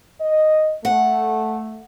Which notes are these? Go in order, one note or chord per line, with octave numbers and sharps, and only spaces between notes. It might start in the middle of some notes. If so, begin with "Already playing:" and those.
D#5
A3 F#5